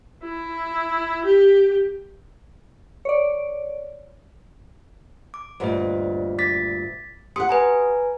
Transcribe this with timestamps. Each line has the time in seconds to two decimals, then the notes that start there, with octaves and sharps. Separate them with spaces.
0.24 E4
1.24 G4
3.05 C#5 D5
5.34 D6
5.60 D2 G2 A#2 C5 D#5
6.38 D6 A6 B6
7.36 G4 F#5 C6 D#6 C#7
7.49 B4 G#5 A#5